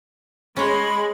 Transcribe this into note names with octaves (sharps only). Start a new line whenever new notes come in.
G#3 C#4 C#5 B5 C6